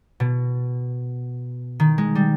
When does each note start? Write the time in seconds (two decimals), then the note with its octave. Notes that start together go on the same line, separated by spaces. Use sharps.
0.20 B2
1.80 D#3
1.98 G#3
2.15 G3